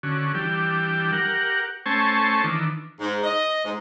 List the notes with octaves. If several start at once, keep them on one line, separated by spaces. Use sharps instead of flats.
D3 C#4 F#4
E3 G3 D4 G4
G4 A#4 F#5
A3 C#4 C5 G#5 A5 C#6
D#3 E3 D4
G#2
D#5
G#2